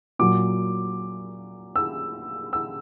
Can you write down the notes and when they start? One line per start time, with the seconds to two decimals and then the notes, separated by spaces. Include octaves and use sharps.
0.19 A#2 F#3 D6
1.76 E6
2.53 E6